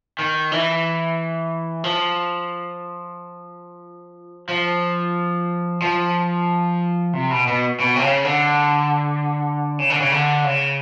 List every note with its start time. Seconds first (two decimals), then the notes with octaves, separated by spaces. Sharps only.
0.19 D#3
0.52 E3
1.84 F3
4.49 F3
5.82 F3
7.13 C3
7.31 B2
7.47 B2
7.80 B2
7.96 C3
8.01 C#3
8.25 D3
9.79 C#3
9.90 D3
10.00 C#3
10.12 D3
10.44 C#3